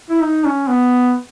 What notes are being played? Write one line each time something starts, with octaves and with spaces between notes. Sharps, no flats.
E4
D#4
C#4
B3